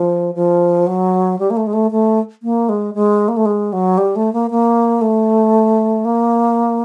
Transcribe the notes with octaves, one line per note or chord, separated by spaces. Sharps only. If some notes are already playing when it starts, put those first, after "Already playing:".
Already playing: F3
F3
F#3
G3
A#3
A3
G#3
A3
A3
A#3
G#3
G#3
A#3
A3
G#3
F#3
G3
A3
A#3
A#3
A3
A#3